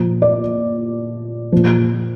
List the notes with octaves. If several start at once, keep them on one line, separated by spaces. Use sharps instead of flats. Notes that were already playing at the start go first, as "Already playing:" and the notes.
Already playing: A#2 F3
D5
A#2 F3